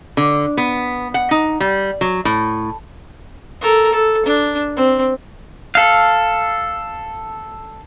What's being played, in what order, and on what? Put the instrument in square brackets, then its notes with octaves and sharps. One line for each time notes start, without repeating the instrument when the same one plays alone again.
[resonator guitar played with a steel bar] D3
B3
F#5
D#4
G3
F#3
A2
[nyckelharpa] A4 A#4
A4
D4
C4
[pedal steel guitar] A4 F5